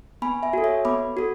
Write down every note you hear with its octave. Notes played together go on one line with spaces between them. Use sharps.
B3 G#5 B5
E5 G#5
F#4 A4
C#5 E5
B3 B5 D6
F#4 A4